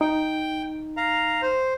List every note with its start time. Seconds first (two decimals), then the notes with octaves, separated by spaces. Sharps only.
0.01 D#4 G5
0.97 F5 A#5
1.42 C5